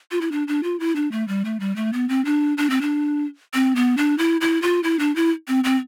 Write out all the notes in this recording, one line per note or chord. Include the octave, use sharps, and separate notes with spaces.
F4
E4
D4
D4
F4
E4
D4
A3
G3
A3
G3
A3
B3
C4
D4
D4
C4
D4
C4
B3
D4
E4
E4
F4
E4
D4
E4
C4
C4